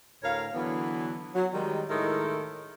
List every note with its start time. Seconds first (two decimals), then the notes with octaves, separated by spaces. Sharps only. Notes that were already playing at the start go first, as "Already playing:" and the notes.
0.24 D2 A2 A#4 C#5 F5
0.55 D3 E3 F#3 B3
1.35 F#3
1.53 D#3 G3 G#3
1.89 A2 D#3 G#3 E4 A4 A#4